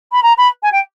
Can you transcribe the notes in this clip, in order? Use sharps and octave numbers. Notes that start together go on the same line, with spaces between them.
B5
A#5
B5
G#5
G5